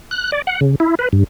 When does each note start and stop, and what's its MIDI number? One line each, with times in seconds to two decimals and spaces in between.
0.11 0.31 90
0.32 0.42 74
0.47 0.60 78
0.61 0.75 49
0.80 0.95 64
0.99 1.09 71
1.13 1.24 43